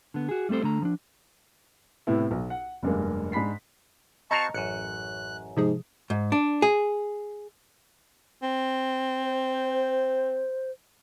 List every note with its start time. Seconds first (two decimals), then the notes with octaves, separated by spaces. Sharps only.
0.14 D3 B3
0.29 F#4 G#4
0.49 G3 A3 C4 A4 C5
0.63 D3 A3 A#5
0.82 F3 D4
2.07 A2 C3 B3 E4
2.31 B1
2.50 F#5
2.83 F1 G2 G#3 A#3
3.32 G#2 D4 B5 B6 C7
4.31 C4 F#4 D#5 F5 A5 A#5 C#6
4.54 A1 F#2 F#6 C#7
5.57 G#2 C3 F3 G#4
6.10 G#2
6.32 D4
6.62 G#4
8.43 C4
9.23 C5